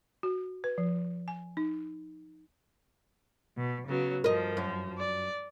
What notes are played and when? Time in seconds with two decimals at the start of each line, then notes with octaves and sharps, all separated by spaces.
0.23 F#4
0.64 B4
0.78 F3
1.28 G#5
1.57 D#4
3.57 B2
3.87 C#3 F#3 B3
4.24 G2 F3 A#4 D#5
4.57 F#2
4.98 D5